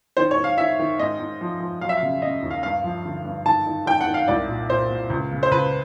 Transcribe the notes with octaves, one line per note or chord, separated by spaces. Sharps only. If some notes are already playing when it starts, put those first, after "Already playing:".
D#3 C5
C#5
D#3
F5
D#3 E5
D#3
G#2 D#5
G#2
F3
F3
F#3 F5
E5
F5
C#3
C#3 D#5
D#2
F5
G2 F5
F3
D3
G2
D#3 A5
D#3
D#3 G5
F#5
D#3
F5
C2 D5
A#2
A#2 C5
A#2
C#2
C#3
C5
C#2 B4